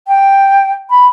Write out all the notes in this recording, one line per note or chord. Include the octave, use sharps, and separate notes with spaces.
G5
B5